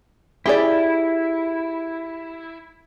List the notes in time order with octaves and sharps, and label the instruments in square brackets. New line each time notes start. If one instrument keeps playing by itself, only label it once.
[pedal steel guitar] E4 [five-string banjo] G4 G#4 D5